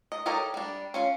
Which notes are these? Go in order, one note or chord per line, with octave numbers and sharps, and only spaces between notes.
D#5
G4 A4 A#4 C#5 D#5
G3 D4
C#4 F4 F5